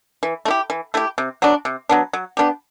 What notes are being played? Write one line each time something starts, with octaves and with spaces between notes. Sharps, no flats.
E3
A3
E4 G4
E3
A3 E4 G4
C3
F#3 B3 D4
C3
F#3 B3 D4
F#3
B3 D4 G4